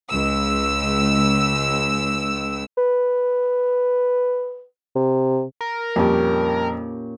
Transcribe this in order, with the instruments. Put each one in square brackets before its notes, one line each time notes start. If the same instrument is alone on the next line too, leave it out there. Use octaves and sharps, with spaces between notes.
[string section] C#2 E6
[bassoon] B4
C3
[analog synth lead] A#4
[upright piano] F2 G3 [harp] A#2 C#4 G4